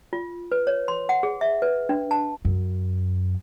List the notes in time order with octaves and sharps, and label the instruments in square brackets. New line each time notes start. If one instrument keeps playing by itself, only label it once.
[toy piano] F4
B4
C#5
C6
F#5
G#4
E5
B4
D4
A5
[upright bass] F#2